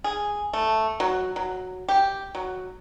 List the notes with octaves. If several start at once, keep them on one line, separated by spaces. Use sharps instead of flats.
G#4
A3
F#3
F#3
G4
F#3